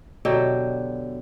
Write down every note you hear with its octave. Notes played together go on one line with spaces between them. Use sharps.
B2 D3 F#3 G4